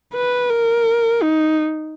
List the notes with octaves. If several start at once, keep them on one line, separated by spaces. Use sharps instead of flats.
B4
A#4
D#4